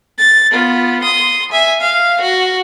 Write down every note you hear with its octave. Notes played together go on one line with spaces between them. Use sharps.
A6
B3 F4
C6 D#6
E5 G#5
F5
F#4